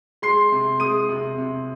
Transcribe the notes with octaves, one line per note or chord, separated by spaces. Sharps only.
G#3 C6 C7
C3
G#3 D#6 D#7
C3
C3